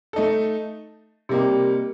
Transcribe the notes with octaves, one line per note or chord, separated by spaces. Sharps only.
A3 D#4 A4
C3 G3 A#3 D#4